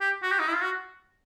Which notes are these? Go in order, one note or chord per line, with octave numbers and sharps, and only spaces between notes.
G4
F#4
G4
D#4
E4
F4
F#4